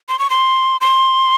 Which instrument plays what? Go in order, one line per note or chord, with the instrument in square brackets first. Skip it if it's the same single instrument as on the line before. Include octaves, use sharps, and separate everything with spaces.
[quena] C6
C#6
C6
C6